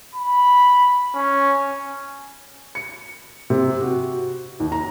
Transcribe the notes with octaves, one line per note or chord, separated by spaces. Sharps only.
B5
C#4
C#7
C3
F#4
D#2
A#5